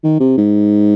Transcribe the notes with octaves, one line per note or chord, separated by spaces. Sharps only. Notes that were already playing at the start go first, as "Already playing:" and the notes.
D#3
C3
G#2